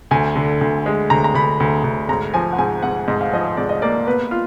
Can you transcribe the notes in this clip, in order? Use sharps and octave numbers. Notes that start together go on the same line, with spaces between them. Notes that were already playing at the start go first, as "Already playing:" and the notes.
D2 G#5
D3
D2
G#3
D2 A#5
A#5
D2 B5
D2
D2
G#2 A#5
F3 G#5
F#5
G#2 G#5
G#2 F#5
G#2 D#5
F5
F3 D#5
G#2 D5
D#5
A#3 D5
B3 B4
F4